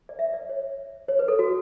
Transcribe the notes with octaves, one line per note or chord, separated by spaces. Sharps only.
D5
E5
D5
C#5
C#5
B4
A4
F#4